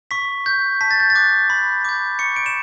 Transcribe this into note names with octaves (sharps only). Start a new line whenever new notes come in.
C#6 B6
G6
A5 B6
A6
G6
A6
D6 F#6
B5
D6 G6
C#6 C#7
D7
E7